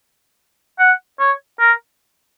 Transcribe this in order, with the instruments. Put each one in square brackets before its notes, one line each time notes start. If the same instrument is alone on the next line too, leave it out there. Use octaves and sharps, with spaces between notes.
[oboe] F#5
C#5
A#4